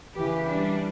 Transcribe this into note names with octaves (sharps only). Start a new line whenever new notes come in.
C#3 E3 G4 B4
G3 D4